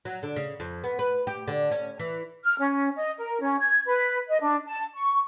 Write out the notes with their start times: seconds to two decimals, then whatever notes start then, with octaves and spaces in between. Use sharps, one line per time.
0.05 F#3
0.23 D3
0.36 C#3
0.60 F2
0.84 B3
0.99 B4
1.27 G4
1.48 D3
1.71 C#4
1.99 E3
2.44 F6
2.59 C#4
2.96 D#5
3.18 A#4
3.41 C#4
3.59 G#6
3.85 B4
4.29 D#5
4.41 D4
4.66 A5
4.95 C#6